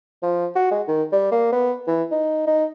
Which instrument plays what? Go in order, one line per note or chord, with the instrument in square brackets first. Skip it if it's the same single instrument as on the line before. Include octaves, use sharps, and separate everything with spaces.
[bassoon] F3
F#4
G#3
D#3
G3
A#3
B3
E3
D#4
D#4